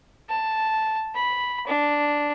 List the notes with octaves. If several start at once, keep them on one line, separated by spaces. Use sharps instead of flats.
A5
B5
D4